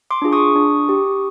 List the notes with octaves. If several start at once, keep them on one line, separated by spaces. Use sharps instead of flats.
C6 D6
D4 F4 G#4
C#6 D#6
D4
G4